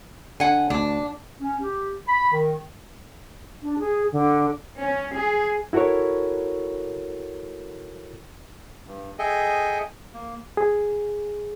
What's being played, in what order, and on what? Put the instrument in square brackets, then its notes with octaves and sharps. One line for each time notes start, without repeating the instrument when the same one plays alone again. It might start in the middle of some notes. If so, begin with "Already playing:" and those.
[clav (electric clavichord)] D3 [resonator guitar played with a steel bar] F#5 G#5
[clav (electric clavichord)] D2 [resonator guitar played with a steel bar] D4
[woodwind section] C#4
G4
B5
D#3
[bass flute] D4
G#4
D3
[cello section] C#4
G#4
[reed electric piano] E4 F#4 A4 A#4 C#5
[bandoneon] G2
G#4 A4 D#5 E5 G5 G#5
A#3
[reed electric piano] G#4